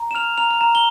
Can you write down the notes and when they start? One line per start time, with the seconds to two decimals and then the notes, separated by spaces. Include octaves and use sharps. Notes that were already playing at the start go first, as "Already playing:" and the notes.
Already playing: A#5
0.11 E7
0.15 F6 F7
0.37 A#5 F7
0.51 F7
0.61 A#5 E7
0.75 G7